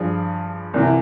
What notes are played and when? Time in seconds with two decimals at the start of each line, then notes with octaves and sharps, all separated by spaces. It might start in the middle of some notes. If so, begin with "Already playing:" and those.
Already playing: G2 F3 G#4
0.74 C2 C3 E3